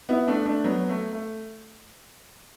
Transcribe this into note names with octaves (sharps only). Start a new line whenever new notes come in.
B3 E4
A3 D4
A3 D4
F#3 B3
A3
A3